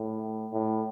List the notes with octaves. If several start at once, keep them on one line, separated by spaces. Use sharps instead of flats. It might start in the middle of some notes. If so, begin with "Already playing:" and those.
Already playing: A2
A2